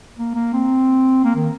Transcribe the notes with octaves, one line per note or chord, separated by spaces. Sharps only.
A#3
A#3
C4
A#3
D#3